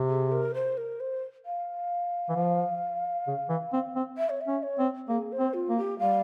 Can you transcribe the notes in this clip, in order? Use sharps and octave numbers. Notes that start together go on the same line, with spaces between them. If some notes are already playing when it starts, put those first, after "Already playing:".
Already playing: C3
G#4
A#4
C5
A#4
C5
F5
E3
F3
C#3
E3
C4
C4
E5
C#5
E5
C#4
C#5
C4
A#3 G#4
C5
C4
F4
A#3
G4
G3 F5